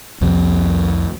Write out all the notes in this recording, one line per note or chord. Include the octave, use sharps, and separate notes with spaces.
C2 F2 C3 F3